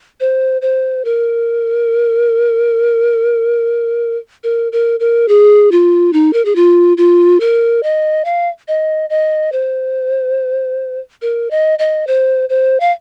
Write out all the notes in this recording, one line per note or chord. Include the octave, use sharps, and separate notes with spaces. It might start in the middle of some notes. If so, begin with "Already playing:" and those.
C5
C5
A#4
A#4
A#4
A#4
G#4
F4
D#4
A#4
G#4
F4
F4
A#4
D#5
F5
D#5
D#5
C5
A#4
D#5
D#5
C5
C5
F5